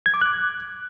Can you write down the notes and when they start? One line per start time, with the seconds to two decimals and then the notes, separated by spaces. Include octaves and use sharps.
0.06 G#6
0.14 D6
0.21 F#6